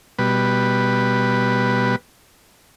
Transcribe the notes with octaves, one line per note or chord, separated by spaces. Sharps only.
B2 G3 B4